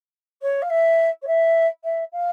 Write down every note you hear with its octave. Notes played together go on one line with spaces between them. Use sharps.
C#5
F5
E5
C#5
E5
E5
F5